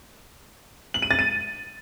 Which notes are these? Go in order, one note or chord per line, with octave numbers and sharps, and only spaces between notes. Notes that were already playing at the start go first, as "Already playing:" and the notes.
F#7
D#7
A6
D#7